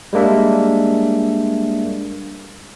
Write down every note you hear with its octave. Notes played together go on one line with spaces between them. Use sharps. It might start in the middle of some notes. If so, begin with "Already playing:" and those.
G3 G#3 A#3 D4 E5